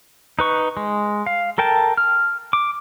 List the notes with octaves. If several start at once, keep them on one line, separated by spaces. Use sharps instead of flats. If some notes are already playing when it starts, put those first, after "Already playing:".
D#4 B4 C#6
G#3
F5
A4 A#4 G5 A5
F6
D6